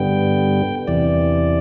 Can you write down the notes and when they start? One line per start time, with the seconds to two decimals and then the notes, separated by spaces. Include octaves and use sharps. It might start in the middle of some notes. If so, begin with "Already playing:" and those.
Already playing: G2 D3 G3 B3 G5
0.87 E2 C3 E3 D5